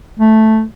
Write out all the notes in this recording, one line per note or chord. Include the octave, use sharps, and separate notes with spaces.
A3